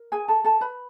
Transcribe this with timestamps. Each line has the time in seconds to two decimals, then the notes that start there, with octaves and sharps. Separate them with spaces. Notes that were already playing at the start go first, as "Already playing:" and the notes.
Already playing: A#4
0.12 G#4 G#5
0.28 A4 A5
0.44 A4 A5
0.61 B4 B5